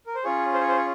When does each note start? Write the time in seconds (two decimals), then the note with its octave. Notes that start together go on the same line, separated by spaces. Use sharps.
0.06 A#4
0.15 C5
0.24 C#4 F4 G#4 C#5
0.53 C5
0.61 C#5
0.69 C5
0.77 C#5